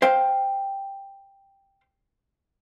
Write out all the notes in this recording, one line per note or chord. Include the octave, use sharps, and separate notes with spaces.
C5 F5 G5